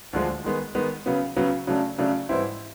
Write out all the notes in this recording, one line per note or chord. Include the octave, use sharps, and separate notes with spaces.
D2 D3 F3 G#3
D#3 G#3 B3
D#3 G#3 B3
C#3 F#3 B3
C#3 F#3 B3
C#3 F#3 A3 D4
C#3 F#3 A3 D4
G#2 E3 G3 C4 E4